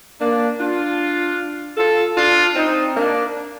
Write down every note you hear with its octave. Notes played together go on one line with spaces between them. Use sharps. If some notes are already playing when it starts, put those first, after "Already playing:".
A#3 D4
D4 F4
F4 A4
D4 F4
C4 D#4
A#3 D4